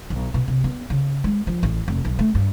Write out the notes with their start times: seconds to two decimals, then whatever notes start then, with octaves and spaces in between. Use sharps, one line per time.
0.10 B1
0.34 B2
0.48 C3
0.64 B3
0.90 C#3
1.24 G#3
1.47 F3
1.63 A1
1.88 F1
2.05 B1
2.19 A3
2.35 G2